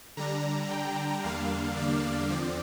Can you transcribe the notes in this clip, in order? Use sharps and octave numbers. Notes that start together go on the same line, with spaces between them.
D3 G3 D4 A#5
G5
E2 D3 G3 A#3 D4 F5
D5
E2 D3 F3 C4